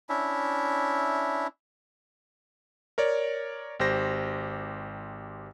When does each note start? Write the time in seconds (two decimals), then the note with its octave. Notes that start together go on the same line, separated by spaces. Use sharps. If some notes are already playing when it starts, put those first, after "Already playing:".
0.09 C#4 D4 E4 E5
2.98 A#4 C#5 D5
3.80 G#1 G4 C5 A#6